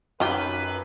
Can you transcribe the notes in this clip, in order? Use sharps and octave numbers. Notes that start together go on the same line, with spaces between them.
F#2 D#3 F4 G4 B4